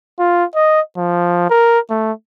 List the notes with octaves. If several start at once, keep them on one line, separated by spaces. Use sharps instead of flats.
F4
D#5
F3
A#4
A3